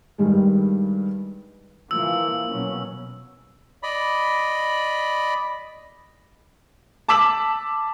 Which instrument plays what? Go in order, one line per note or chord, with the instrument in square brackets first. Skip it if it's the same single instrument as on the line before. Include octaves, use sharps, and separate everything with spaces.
[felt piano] G2 D#3 G3 G#3
[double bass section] E3 F3 A#3 [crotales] E6
[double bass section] B2 F#3 C#4
[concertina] D5 D#5 B5
[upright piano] A5 D6 E6 B6 E7 F#7